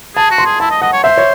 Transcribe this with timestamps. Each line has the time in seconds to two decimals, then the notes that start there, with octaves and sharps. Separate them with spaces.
0.16 G#4 A5
0.31 F#4
0.38 C6
0.46 G#4
0.60 E4 A5
0.71 D#5
0.82 D#5 F#5
0.93 C#5
1.04 C5 E5
1.18 C#5